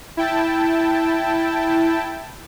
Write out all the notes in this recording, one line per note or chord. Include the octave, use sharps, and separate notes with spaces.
E4 G5 A5